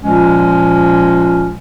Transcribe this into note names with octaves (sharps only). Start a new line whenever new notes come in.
A#2 F3 G#3 C#4